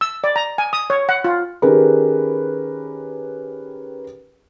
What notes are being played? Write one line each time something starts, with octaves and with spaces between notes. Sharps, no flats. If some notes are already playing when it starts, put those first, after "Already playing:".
E6
D5
A#5
G#5
D#6
C#5
F#5
F4
D#3 C#4 G4 G#4 A#4 B4